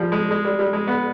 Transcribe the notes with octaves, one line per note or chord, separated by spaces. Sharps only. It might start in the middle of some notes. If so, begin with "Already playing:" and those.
Already playing: F3 G3
G#3
G#3
G3
G3
G#3
B3